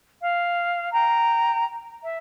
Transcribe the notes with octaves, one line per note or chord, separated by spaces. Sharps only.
F5
G5 A#5
E5